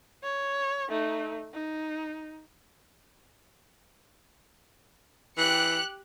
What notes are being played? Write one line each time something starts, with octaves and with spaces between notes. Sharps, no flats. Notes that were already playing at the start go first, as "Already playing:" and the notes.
C#5
A3 D#4
D#4
E3 G4 F#6 C#7